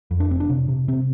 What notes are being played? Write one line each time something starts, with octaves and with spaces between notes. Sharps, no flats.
F2
D4
F1 C4
D4
C3
C3
C3 C4